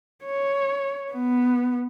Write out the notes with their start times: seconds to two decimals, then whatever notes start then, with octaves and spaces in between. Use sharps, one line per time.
0.24 C#5
1.12 B3